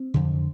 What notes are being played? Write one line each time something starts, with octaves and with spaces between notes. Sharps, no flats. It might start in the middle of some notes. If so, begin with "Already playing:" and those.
Already playing: C4
F2 D3